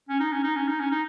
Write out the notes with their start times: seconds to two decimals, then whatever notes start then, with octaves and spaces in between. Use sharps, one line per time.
0.09 C#4
0.20 D#4
0.32 C#4
0.44 D#4
0.56 C#4
0.68 D#4
0.79 C#4
0.91 D#4